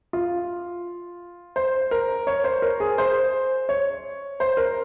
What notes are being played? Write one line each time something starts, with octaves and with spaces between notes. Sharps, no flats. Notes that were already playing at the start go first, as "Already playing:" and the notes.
F4
C5
A#4
C#5
C5
A#4
G#4
C5
C#5
C5
A#4